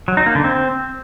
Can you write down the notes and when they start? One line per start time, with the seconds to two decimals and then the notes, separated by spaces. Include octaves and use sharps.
0.08 F#3
0.17 D#4
0.26 A#3
0.35 D3
0.44 C4